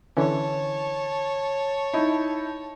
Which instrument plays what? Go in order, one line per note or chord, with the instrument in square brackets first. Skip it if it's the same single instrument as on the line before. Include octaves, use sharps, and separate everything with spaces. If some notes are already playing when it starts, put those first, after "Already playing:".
[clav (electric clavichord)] D3 E3 C#4 [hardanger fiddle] C#5 A5
[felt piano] D#4 E4